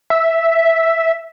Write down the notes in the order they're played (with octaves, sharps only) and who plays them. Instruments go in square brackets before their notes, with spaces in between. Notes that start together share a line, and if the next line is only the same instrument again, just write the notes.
[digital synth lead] E5